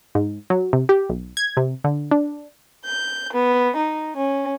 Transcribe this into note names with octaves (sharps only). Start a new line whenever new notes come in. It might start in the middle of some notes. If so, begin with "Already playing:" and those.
G#2
F#3
C3
G4
B1
G#6
C3
D3
D4
G6
B3
D#4
C#4